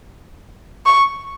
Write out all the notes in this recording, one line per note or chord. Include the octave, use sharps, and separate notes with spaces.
C#6